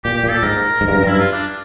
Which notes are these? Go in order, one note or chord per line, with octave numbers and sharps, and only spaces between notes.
A#2 G4
G4
A#2
A4
G#2 A#4
G#2
G2
F#2
G2 E4
F4
D4